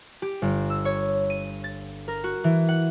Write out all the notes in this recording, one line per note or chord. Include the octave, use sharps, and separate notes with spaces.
G4
G1
E6
C#5
D#7
A6
A#4
F#4
E3
F#5